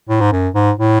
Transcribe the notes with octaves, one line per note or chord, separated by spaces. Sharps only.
A2
G#2
F#2
G#2
A2